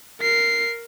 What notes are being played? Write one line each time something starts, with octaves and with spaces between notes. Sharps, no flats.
A#4 C7